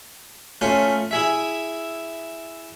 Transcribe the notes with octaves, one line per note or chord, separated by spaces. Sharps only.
A3 C#4 F4 C5
E4 G#4 E5